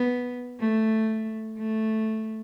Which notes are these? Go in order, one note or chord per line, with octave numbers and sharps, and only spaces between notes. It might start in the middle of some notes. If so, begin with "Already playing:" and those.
Already playing: B3
A3
A3